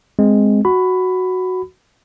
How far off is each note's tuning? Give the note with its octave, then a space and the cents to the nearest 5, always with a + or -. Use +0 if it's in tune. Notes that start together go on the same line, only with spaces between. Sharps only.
G#3 +0 C4 +0
F#4 +0 B5 +15